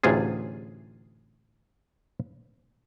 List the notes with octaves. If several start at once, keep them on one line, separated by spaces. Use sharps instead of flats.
A1 D2 C3 F4 G#4